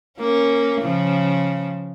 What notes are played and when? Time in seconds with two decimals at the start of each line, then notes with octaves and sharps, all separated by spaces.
0.19 A#3 C#4
0.81 C#3 F3